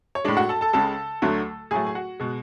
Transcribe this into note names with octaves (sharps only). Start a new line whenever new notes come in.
C#5
A2 G#3 D4 D5
F#4 F#5
A4 A5
A4 A5
C#2 C#3 G#3 A4 A5
D2 D3 F#3 A3
A2 F#3 A3 G#4 G#5
G#5
F#4 F#5
B2 G#3